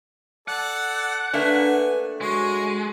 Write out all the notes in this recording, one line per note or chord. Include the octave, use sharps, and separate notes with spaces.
A4 D5 F#5 A5
A3 A#3 D4 B4 G#5
G#3 F#4 C#5